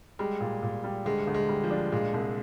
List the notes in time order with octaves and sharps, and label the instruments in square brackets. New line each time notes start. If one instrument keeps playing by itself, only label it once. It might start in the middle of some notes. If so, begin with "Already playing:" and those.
[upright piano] G3 [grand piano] G#3
[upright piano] A#2
A#2
G3
[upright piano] D2 [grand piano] G#3
[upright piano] D2
[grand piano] G#3
[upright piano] G3
[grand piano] F3
[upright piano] D4
[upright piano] A#2 [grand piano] G#3
[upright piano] C2